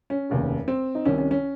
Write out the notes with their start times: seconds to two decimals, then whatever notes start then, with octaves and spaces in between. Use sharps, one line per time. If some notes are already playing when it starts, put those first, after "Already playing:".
0.10 C#4
0.30 F1 D#2 C#3
0.68 C4
0.95 D#4
1.05 C2 C3 D#3 C#4
1.18 C#4
1.31 C#4